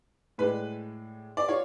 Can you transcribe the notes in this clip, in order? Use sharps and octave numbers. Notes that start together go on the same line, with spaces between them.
A2 G#3 D4 B4
D5
D4 F4 C#5